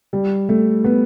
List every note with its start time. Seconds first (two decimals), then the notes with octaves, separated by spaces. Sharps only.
0.13 G3
0.49 A3
0.84 B3